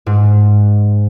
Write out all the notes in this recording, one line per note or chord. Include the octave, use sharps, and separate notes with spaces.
G#2